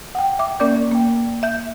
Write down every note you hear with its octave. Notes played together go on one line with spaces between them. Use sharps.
F#5 G5
E5 D6
A#3 C#4 A#4 D5 D6 G6
A#3 G5
E5 G6